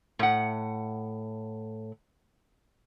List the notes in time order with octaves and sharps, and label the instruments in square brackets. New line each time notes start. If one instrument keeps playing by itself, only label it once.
[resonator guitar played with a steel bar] A2 F#5